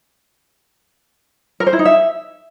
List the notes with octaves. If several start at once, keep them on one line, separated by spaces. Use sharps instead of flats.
A#4
C5
E4
D#4
E5